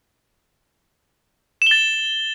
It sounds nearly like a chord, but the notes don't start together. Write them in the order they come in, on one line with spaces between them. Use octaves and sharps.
E7 G7 A6